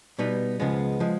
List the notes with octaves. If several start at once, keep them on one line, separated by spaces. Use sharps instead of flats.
B2 G3 B3 D#4
C#2 C#3 F3 G#3 B3
F3 G#3